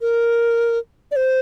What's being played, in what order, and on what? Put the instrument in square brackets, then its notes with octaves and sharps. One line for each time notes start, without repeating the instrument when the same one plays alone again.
[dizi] A#4
D5
C5